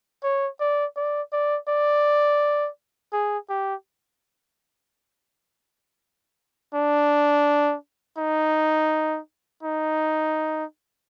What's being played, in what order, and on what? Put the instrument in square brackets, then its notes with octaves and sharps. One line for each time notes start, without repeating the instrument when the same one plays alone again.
[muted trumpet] C#5
D5
D5
D5
D5
G#4
G4
D4
D#4
D#4